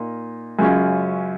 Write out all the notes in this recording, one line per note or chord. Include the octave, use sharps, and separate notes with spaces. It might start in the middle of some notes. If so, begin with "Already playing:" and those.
Already playing: A#2 A#3 D#4
F#2 C#3 G#3 C#4 F4